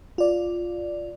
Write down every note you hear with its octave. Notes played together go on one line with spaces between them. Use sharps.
F4 D5